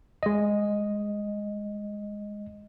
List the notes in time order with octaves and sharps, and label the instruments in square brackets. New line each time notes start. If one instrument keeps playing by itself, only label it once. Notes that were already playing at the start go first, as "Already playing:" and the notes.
[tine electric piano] G#3 D#5